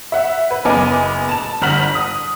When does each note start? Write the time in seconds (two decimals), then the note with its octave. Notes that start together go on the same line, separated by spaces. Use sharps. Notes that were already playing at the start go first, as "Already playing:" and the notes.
0.12 E5 F#5
0.51 B4
0.65 F#1 B3 D#5 G#5 D6
1.29 A5 E7
1.62 G1 F#5 A#5 F6 B6 F#7
1.95 D#6